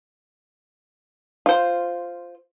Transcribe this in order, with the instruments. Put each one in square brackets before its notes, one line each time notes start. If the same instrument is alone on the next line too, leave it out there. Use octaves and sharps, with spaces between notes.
[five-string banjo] F4 C5